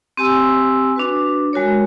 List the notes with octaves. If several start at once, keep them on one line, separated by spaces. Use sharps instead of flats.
C4 G4 G#5 E6
D4 F#4 B4
G#3 F#4 A#4 C#5